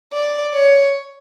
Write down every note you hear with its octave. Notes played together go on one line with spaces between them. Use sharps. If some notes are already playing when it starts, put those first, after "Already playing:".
D5
C#5